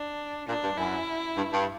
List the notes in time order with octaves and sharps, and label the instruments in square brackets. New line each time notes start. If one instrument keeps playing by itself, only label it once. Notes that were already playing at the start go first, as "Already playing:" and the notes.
Already playing: [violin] D4
[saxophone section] A#2 [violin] D4
[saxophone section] G2
[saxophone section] F#2 [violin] E4
[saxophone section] G2
G2